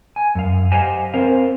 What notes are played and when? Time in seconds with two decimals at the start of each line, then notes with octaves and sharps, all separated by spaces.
0.16 G#5
0.35 F#2 F5
0.72 G4 C5 D#5 F5 F#5 G#5
1.14 C4 A#4 C5 F5